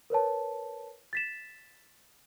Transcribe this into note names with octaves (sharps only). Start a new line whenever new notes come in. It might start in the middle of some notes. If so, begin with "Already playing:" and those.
A#4 B4 C#5 A5
A6 B6 E7